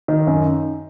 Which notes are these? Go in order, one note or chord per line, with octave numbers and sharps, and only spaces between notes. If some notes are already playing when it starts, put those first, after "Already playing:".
D#3
F#2